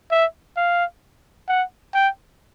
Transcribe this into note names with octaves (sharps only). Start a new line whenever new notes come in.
E5
F5
F#5
G5